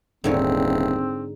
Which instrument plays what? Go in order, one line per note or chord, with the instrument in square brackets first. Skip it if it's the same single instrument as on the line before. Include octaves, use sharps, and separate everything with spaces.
[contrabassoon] D#1 [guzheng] G#2 D3 C#5 [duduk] C4